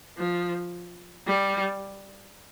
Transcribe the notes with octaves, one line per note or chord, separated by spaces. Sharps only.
F3
G3